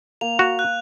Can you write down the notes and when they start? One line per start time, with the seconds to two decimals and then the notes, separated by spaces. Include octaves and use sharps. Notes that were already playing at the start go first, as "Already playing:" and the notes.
0.21 A#3 F7
0.39 F#4
0.59 F#6